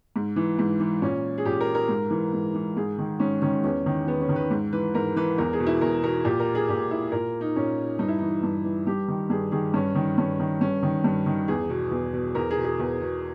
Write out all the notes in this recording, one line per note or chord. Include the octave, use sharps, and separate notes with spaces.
G#2
E3
G#2
E3
A#2 C#4
G#4
A#2 G4
A#4
A#4
G#2
E3
G#2
E3
G#2 G#4
D#3
G#2 C#4
D#3 C#4
E2 C#4
D#3
E2 B3
C#4
D#3
B4
G#2
E3 B4
G#2 A#4
E3 B4
E2 A#4
G#4
B2
E4
E2 A#4
B2 A#4
A#2 G4
A#4
G#4
A#2 G4
E4
A#2 A#4
D#4
A#2 C#4
G2 D#4
E4
E3 D#4
G2
E3
G2 G4
D#3
G2 G#4
D#3 G#4
G2 C#4
D#3
G2 C#4
D#3
G2 C#4
D#3
G2
D#3
E2 G#4
B2
E2
B2
E2 A#4
G#4
B2
G#4
E2
B2